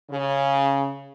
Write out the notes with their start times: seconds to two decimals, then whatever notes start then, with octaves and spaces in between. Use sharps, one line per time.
0.11 C#3